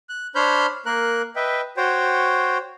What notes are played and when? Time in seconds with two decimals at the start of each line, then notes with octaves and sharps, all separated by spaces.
0.09 F#6
0.35 D4 C5 C#5 B5 F6 G6
0.86 A#3 A#4 F#6
1.36 B4 D#5 E5 G5
1.77 F#4 C5 C#5 G5